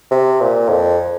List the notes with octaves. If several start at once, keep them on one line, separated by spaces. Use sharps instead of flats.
C3
A#2
F2